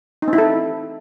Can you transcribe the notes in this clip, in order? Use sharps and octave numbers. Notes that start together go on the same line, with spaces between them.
D#4
C4
E4
A4